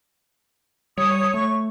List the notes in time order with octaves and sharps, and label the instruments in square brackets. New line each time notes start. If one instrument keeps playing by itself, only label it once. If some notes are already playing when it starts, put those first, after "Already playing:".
[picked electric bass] G3 [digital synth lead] C#5 [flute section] D#6
[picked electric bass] A3 [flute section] C#6